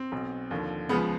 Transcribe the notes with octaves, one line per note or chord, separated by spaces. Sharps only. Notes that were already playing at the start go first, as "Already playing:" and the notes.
Already playing: C4
B1 B2
D#2 D3 F3
C#2 C#3 F3 B3